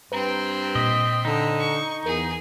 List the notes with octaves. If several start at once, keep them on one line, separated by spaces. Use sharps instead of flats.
G2 C4 B4 G5 A#5
A#2 D#5 B6
D3 D#4
C#6
E2 G#4 A#4